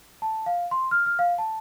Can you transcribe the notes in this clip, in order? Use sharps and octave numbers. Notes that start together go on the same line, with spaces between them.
A5
F5
C6
F6
F6
F5
A5